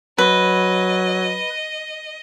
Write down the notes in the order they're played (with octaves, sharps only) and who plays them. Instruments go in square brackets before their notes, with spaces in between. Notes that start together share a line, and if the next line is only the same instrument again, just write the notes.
[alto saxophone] F#3 [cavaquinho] B4 [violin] D#5